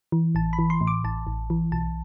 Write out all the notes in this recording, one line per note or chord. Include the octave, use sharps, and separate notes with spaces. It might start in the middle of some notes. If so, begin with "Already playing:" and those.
E3
A1 A5
B5
E3
C6
A2
D6
A1 A5
A1
E3
B1 A5